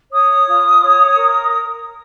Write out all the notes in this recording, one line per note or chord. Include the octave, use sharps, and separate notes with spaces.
C#5 D#6
F4
C#5
A#4